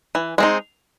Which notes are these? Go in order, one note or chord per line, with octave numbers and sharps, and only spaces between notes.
E3
G#3 C4 D#4